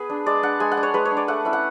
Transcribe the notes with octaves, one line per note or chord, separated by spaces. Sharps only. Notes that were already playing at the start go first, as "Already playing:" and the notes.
Already playing: B3 G#4 B4
D4
G#3 D5
D4 F#5
G#3 G#5
F#5
D4
C#5
G#3 B4
C#5
D4
D5
A3 F#5
C#4 E4
F#5